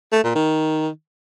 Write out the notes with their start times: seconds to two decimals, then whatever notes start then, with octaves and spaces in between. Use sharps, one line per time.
0.12 A3
0.23 A#2
0.35 D#3